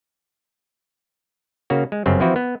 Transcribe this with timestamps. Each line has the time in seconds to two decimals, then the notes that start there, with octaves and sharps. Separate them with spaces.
1.70 C#3 A#3 F#4
1.92 G#3
2.06 G1 F#2 C#3 C4
2.20 E3 F3 C4 E4 F#4
2.36 B3